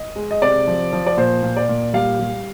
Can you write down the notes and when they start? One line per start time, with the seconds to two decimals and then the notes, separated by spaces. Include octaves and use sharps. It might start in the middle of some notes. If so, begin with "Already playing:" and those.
Already playing: D#5
0.16 G#3
0.31 D#5
0.42 C3 D5
0.67 F3
0.93 F3
1.06 D5
1.17 A#2 C5
1.43 A#2
1.57 D5
1.69 A#2
1.93 G3 F5
2.19 G3